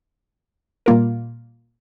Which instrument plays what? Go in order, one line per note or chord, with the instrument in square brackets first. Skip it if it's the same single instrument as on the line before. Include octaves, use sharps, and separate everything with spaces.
[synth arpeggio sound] A#2 G3 A#3 F4 A#4